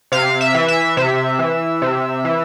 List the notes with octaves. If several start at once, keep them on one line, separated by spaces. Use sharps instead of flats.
C3 F5
E5
E3
E5
C3 E5
E3
C3
E3